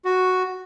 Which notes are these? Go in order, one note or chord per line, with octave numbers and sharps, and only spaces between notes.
F#4